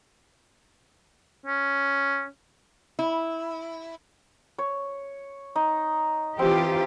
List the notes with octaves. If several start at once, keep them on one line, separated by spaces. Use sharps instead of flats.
C#4
E4
C#5
D#4
E3 C4 F4 G4